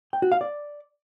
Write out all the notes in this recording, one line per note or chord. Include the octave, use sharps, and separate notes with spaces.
G5
F#4
F5
D5